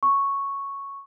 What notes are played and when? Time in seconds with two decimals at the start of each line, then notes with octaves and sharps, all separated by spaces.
0.03 C#6